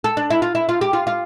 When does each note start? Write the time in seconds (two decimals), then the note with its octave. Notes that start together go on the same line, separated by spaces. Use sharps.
0.04 A4
0.17 D4
0.30 E4
0.42 F4
0.55 E4
0.69 F4
0.81 G4
0.93 F4
1.07 F4